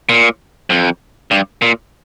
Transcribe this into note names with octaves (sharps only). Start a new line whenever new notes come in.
A#2
F2
G2
A#2